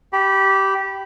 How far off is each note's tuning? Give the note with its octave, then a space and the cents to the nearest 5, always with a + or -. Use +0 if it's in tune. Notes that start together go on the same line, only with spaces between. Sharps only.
G4 -15 B5 +0